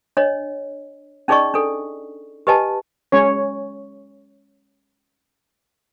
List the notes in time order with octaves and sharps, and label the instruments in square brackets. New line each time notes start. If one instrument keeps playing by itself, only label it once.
[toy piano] D4 C#5 D#5
C#4 D#4 G#4 D5 D#5 C#6
D4 A4
G4 B4 D#5 G#5 A5
[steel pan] G#3 C#4 C#5